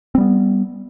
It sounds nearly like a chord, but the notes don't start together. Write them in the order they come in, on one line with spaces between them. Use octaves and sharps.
C4 G3 B3